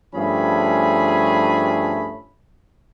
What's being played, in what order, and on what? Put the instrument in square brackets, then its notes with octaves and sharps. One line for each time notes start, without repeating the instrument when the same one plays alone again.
[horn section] G2 F3 A3 C#4 G#4 B5